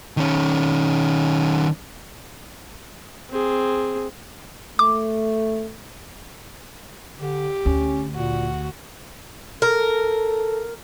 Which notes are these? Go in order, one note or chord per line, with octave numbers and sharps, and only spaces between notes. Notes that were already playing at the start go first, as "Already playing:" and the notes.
D#3 C#4
C4 G#4
A3 D6
D3 G4
D2 C#4
A#2 F#4
A4 A#4